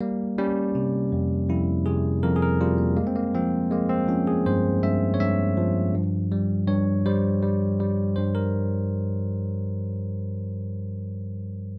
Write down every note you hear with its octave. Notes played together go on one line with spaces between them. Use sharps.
G3 A#3
G3 C#4
C3
F2
F2 E4
C3 G#4
F2 A#4
G#4
A#4
G3 F4
A#3
G#3 A#3
C4
A#3
F3 C4
G#3 A#3
C4
F3 C#4
G#4
G2 C5
G2 E5
C#5
G2 E5
F3
G2
G3
G2 C#5
G3 C5
G3
G3
G2 C5
A#4